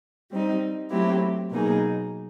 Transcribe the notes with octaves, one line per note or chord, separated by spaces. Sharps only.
G3 C4 D#4
F#3 A3 C4 E4 G4
B2 F#3 A#3 D#4 G#4